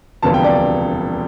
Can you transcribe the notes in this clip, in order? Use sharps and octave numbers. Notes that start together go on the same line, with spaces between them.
E1 D2 C3 F3 B3 A5
G5
D5